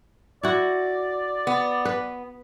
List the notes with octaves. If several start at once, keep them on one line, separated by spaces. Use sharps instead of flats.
E4 F#4 D5
B3
B4